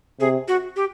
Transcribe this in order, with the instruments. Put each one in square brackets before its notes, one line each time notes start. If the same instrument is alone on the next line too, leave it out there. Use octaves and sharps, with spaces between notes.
[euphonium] C3 [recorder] G#4
[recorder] F#4
G4